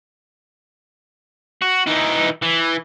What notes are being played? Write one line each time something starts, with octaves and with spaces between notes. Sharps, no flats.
F#4
E3 D#4
E3